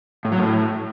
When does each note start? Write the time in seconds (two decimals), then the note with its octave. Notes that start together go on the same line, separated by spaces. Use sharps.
0.25 A2
0.32 F#3
0.39 A2